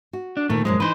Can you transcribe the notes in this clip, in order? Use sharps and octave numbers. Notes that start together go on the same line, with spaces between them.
F#4
D4
D2 A#2 D#3 A3
F#2 A#2 F3 G#3
E3 D#4 B4 C5